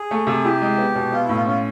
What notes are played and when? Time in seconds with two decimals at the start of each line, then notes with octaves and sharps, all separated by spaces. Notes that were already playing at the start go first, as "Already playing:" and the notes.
Already playing: G#4
0.11 A3
0.27 C3
0.44 E4 G4
0.62 G#3
0.78 B3
0.95 B2
1.12 B3 F4
1.24 E4
1.29 A2
1.35 F4
1.46 C#4 F4